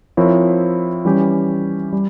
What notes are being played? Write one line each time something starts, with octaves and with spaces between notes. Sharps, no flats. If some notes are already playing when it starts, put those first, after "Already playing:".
F3 C4 E4 A#4 C#5
E3 G3 C#4 G4
G3